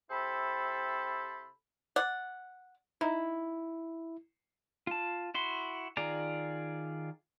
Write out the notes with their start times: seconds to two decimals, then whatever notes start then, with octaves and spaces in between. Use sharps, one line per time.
0.10 C3 C4 E4 A4 C5 B5
1.96 D5 F#5
3.01 D#4 E4
4.87 F4 A5
5.34 E4 F#4 C6
5.97 D#3 F4 G#4 D5 A#5